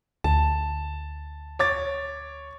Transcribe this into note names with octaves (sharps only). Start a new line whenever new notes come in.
D2 A5
C#5 D6 A6